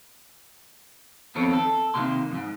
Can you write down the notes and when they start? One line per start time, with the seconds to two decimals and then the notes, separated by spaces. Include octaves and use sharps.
1.35 F2 D#3 B3 C4 A4 C#5
1.53 A4
1.94 C3 D#3 F3 G#3 A#3 C6
2.31 F2 G#2